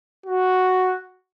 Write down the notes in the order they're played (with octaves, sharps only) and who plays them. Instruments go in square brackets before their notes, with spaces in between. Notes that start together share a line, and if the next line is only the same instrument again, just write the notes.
[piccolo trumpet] F#4